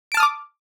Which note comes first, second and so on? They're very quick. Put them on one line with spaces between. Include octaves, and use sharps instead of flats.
D7 A5 F6 D#6 D6